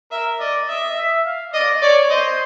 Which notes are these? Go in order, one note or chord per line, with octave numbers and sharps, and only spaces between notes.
A#4 E5
D5 D#5
D#5 E5
E5
F5
D5 D#5
C#5 D5
C5 D#5